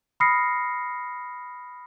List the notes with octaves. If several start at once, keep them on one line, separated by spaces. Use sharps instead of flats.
B5 D#6 F6 A#6 C7 C#7